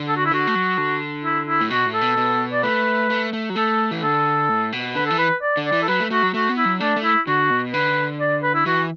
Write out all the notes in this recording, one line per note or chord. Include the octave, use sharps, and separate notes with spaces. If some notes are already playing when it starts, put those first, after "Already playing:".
Already playing: D3
A4
F#4
E4
D3 F#4
A3
F#3
D3
E4
E4
A2
B2 F#4
A2
A4
B2
B2
D5
A3 B4
A3
A3
F#3
A3 A4
E3
D3 A4
A2
B2
D3 B4
E3 A4
B4
D5
D3
D5
E3
A4
F#3 B4
A3
A3 F#4
F#3
A3 F#4
B3
E4
F#3
A3 D4
A3
E4
D3 F#4
B2
D3 B4
D5
B4
E4
E3 F#4